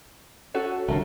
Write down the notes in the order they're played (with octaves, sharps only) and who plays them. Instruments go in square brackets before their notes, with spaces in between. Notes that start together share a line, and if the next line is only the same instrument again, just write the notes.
[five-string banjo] C#4 F#4 A4
[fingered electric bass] C2 D3 [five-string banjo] A3 A#3 F4